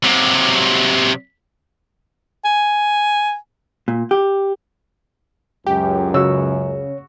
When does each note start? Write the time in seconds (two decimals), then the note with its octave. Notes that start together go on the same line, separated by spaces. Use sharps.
0.04 C3 F#3
2.45 G#5
3.88 A#2
4.11 G4
5.67 C#2 F#2 G4 G5
6.14 C#3 F#4 C#5 E6